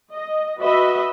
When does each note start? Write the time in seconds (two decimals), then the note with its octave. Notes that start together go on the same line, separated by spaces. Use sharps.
0.12 D#5
0.59 F#4 B4 D#5 E5